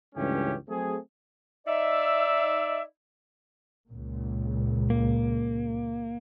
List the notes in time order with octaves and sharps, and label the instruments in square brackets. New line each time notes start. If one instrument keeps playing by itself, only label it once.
[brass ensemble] C#2 G2 E3 A3 C#4 G4
F#3 A3 C4 G#4
[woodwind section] D#4 D5 E5
[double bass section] C#2 A#2
[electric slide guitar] A#3